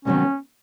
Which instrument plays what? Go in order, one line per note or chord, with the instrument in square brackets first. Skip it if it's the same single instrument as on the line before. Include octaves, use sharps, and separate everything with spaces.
[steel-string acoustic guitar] D2 C3 D#3 F#3 B3 [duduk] C#4